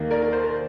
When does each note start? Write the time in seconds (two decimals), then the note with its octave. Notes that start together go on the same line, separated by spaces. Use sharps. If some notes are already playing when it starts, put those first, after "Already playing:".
Already playing: D#2 D#3 A#3
0.11 A#4 D5
0.22 A#4
0.33 C5
0.44 A#4